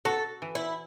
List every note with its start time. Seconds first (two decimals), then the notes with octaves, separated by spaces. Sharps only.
0.05 F#4 A4
0.42 E3
0.55 E4